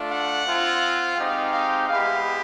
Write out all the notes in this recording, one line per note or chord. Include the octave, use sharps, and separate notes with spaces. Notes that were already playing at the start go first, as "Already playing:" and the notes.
Already playing: A3 D4 F4
F#5
C4 F4
G#3 C4 D#4 G4 F5
F5
G#3 B3 E4 G4 F5